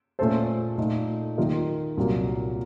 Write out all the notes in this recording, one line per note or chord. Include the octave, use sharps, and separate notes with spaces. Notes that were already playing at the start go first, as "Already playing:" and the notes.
A#2 A3 C#4 A4 C5
A#2 A3 D#4
D#3 A#3 F4 A#4 D#5
C2 A#2 F#3 A#3